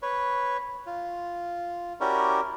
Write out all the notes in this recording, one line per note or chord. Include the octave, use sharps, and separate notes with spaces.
B4 C#5
F4
C#4 E4 F#4 G4 A#4 D5